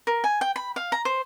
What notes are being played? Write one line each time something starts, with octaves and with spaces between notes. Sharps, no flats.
A#4
G#5
G5
B5
F5
A#5
C5